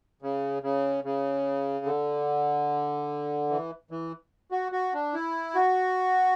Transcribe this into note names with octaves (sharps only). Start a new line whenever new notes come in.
C#3
C#3
C#3
D3
E3
E3
F#4
F#4
D4
E4
F#4